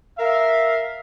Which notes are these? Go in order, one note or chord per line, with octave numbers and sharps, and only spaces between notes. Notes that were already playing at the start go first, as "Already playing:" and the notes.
A#4 E5 F5